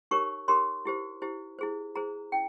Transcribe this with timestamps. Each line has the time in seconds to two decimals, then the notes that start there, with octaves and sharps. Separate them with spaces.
0.11 D#4 G4 A#4 C#5 C#6
0.48 D#4 G4 A#4 C#5 C6
0.85 E4 G4 C5
1.22 E4 G4 C5
1.59 E4 G#4 C5
1.95 E4 G#4 C5 A#5
2.32 C#4 E4 G5